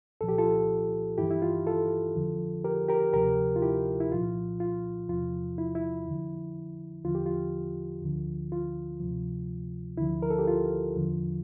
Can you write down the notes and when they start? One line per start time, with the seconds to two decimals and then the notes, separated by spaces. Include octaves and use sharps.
0.21 C2 A#2 F3 A4
0.29 G4
0.38 F4 A4
1.18 G2 E3 E4 G4
1.30 E4
1.42 F4
1.67 F4 A4
2.16 F2 D3 F3
2.64 G4 A#4
2.88 G4 A#4
3.13 D2 C3 F3 G4 A#4
3.56 F4
3.62 E4 G4
4.00 E4
4.11 C2 A#2 F3 F4
4.60 F4
5.09 E2 C3 F3 F4
5.58 E4
5.75 E4
6.07 F2 D3 F3
7.04 E2 D3 F3 F4
7.15 G4
7.26 F4
8.02 D2 D3 F3
8.52 F4
9.00 D2 C3 F3
9.97 D2 D3 F3 E4
10.22 A#4
10.30 A4
10.39 G4
10.47 F4
10.96 E2 D3 F3